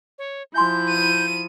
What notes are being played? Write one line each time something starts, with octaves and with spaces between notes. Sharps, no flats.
C#5
F3 E4 E5 G#5 C6 G6
D#7